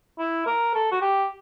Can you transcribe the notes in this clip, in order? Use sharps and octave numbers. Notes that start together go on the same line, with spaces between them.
E4
A#4
A4
F#4
G4